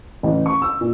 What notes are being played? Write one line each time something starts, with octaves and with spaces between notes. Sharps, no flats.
A1
C#6
E6
A#2